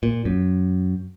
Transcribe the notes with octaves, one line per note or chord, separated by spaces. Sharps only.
A#2
F#2